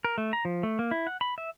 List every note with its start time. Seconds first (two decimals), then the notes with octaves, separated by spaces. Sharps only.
0.05 A#4
0.18 A3
0.33 A#5
0.45 F3
0.63 A3
0.79 A#3
0.91 E4
1.07 F#5
1.21 B5
1.38 E5